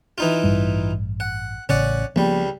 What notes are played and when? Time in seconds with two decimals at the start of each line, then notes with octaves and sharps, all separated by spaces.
0.18 E3 D#4 F4
0.44 A1 G2 G3
1.20 F#5
1.69 A1 C#3 C#4 D5 F#5
2.16 C#2 F3 G3 A#3 B3